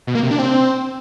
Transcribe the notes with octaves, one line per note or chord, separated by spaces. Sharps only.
B2
A#3
C3
D4
C4